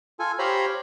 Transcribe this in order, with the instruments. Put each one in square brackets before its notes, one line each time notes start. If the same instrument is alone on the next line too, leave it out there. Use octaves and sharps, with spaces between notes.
[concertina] F4 A4 G#5
G4 C5 C#5 F5 A#5 B5